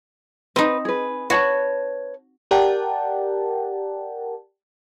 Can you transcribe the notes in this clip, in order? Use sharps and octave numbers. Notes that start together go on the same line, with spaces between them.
C4 D#4 B4
G#4 B4
F#4 B4 C#5 A5
G4 A#4 D5 F#5 G5 A5